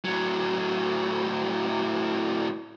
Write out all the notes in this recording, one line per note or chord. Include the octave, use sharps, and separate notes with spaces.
A2 F#3